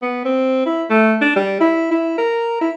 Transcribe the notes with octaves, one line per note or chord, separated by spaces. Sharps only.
B3
C4
E4
A3
D4
G3
E4
E4
A#4
E4